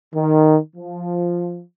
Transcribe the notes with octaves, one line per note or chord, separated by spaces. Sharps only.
D#3
F3